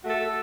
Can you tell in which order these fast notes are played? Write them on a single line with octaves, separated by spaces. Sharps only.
F#4 A3 A4